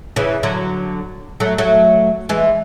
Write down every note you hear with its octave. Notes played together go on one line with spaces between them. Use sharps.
C#3 E3
D3 F#3
F#3 A3
F#3 A3
E3 G#3